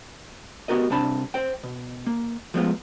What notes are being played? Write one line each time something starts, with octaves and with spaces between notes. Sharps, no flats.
B3 F#4 G4 A#4 D#5
C2 C3 D4 A5 B5
C5 G5
B2
A#3
F3 G#3 A3 B3 F4